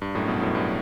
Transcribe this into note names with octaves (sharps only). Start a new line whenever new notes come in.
G2
F#2 A2
G2 B2
F#2 A2
G2